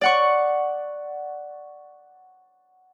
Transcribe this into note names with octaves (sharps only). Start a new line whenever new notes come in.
D5 F#5 C#6